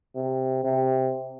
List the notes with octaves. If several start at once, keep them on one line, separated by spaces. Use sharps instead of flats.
C3
C3